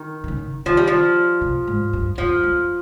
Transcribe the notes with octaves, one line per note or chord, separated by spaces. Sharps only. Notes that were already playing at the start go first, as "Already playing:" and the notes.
Already playing: D#3
C3
C#3
D#3 F3
G3
F3
C3
G#2
G2
F2 F3
F2